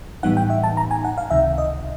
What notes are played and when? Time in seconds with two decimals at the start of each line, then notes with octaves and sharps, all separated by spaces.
0.23 A2 E3 G3 B3 D#4 F#5
0.37 G5
0.50 E5
0.64 A5
0.77 A#5
0.91 G#5
1.05 F#5
1.18 F5
1.30 C#2 C3 D#3 E5
1.58 D#5